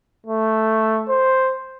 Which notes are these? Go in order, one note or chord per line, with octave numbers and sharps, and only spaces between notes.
A3
C5